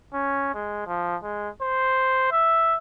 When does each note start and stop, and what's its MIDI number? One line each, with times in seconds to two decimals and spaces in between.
0.13 0.51 61
0.54 0.84 56
0.87 1.16 53
1.23 1.49 56
1.62 2.29 72
2.32 2.77 76